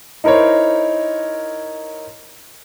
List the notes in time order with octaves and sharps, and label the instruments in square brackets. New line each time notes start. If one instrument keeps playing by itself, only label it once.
[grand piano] D#4 E4 A#4 C5 C#5